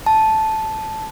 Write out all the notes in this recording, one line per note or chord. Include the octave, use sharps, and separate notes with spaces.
A5